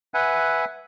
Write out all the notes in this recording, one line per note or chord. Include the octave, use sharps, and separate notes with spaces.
B4 E5 F#5 G#5